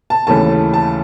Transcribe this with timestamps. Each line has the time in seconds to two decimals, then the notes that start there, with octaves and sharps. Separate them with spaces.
0.10 A5
0.27 D#2 C#3 E3 A3 C#4 A5
0.74 A5